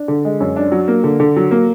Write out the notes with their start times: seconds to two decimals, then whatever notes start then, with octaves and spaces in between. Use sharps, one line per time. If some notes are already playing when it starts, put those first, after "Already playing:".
Already playing: D4
0.08 D3
0.25 G#3
0.40 F#2
0.56 D4
0.72 F#3
0.88 A#3
1.04 D3
1.20 D3
1.36 F#3
1.51 A#3